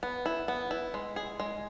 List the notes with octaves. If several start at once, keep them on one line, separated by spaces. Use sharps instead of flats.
B3
E4
B3
E4
G#3
G#4
G#3